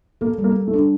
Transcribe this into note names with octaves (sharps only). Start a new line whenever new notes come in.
A#3 A4
G3
A#3
G3
A3
D4